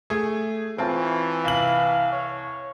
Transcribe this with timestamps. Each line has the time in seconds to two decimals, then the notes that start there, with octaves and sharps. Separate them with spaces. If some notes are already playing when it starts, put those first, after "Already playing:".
0.10 A3 G#4
0.78 E3 C4 C#4 F4 A5
1.45 C2 E4 F5 F#7
2.12 C#5